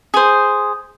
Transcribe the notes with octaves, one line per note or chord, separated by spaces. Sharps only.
G#4 C5